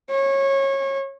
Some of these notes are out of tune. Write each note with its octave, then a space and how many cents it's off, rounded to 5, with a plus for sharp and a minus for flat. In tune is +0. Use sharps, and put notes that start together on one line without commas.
C#5 -25